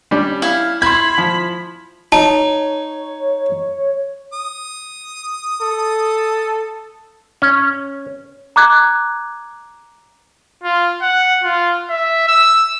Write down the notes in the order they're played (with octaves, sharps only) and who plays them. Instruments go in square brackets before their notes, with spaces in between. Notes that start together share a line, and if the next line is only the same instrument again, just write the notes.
[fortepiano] G3 C#4 D4
[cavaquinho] E4 F5
[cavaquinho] E4 [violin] B5 [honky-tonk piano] C6 G#6
[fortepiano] F3
[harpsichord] D#4 [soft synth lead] C#5 [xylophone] A5
[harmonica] D#6
[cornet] A4
[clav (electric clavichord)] C#4
[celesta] A#5 D6 F#6 G#6
[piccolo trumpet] F4
F#5
F4
E5
E6